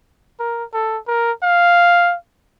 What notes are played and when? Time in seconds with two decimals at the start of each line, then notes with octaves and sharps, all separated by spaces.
0.40 A#4
0.73 A4
1.08 A#4
1.43 F5